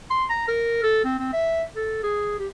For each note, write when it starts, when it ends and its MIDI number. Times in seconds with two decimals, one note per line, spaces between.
0.10 0.24 84
0.30 0.46 82
0.48 0.81 70
0.83 1.00 69
1.04 1.15 60
1.19 1.31 60
1.33 1.62 76
1.76 2.00 69
2.03 2.34 68
2.39 2.47 67